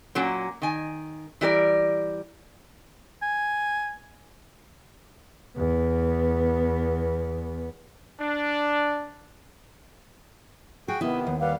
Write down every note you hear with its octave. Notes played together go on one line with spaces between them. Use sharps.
A#2 F#3 A#3 C#4
D#3 G#5
E3 G3 A#4 D5
G#5
E2 B3
D4
F#4 G#4 G5
C3 D#3 B3 E4 D#5
D#2
G3 B4 F5 F#5 D6